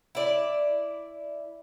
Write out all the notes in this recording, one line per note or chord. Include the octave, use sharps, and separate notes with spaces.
E4 D5